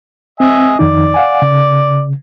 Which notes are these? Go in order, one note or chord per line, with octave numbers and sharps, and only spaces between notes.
C4 D#5 E5 G#5
F2 D#3 D#4 D5
F5 F#5 G#5
C#3